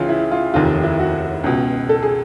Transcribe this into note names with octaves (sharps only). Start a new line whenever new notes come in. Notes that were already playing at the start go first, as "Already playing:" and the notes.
Already playing: C#2 C#3 E3 F4
E4
F4
F1 D#2 D#3 F4
E4
F#4
C#2 B2
A4
G#4